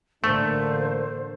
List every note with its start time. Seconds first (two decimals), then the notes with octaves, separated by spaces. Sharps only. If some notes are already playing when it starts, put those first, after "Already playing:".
0.24 A1 D3 A3 A#3 D4 C5